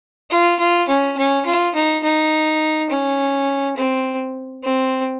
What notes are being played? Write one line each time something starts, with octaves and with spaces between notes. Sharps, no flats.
F4
F4
C#4
C#4
F4
D#4
D#4
C#4
C4
C4